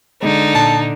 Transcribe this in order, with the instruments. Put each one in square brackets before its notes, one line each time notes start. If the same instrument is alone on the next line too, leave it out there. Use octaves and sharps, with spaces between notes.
[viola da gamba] D3 [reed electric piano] G#3 [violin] D#4
[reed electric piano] A#2 [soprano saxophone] A5